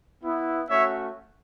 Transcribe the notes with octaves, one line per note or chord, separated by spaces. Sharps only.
B3 E4
A3 C#4 F#4 C#5 E5